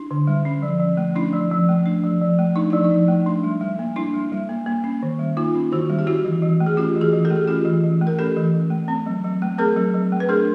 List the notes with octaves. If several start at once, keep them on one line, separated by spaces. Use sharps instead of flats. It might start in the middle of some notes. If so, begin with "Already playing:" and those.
Already playing: D4 E4
D3
G3
C#4
F3
F3
A3
C#4 D4 E4
F3
F3
A3
D4
F3
F3
A3
D4 D#4
F3 E4
D#4
F3
A3
D4
G3
G3
A#3
D4 E4
G3
G3
A#3
A#3
C#4
D#3
G3
A#3 D#4 F4
C#4
D#3 E4 F#4
G3
G4
C#4 E4 F#4
E3
E3
A3
G#4
C#4 F4 G4
E3
F#4 G#4
E3
G4 A4
A3
G#4
C#4 F4 G4
E3
E3
A3
A#4
C#4 G4 A4
E3
E3
A3
C4
F#3
F#3
A3
C4 G#4 A#4
F#3
F#3
A3
B4
D4 G#4 A#4